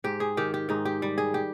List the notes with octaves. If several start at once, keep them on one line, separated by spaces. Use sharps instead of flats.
G#2 G4
G#4
D#3 G4
G4
G#2 D#4
G4
G3
G#4
G4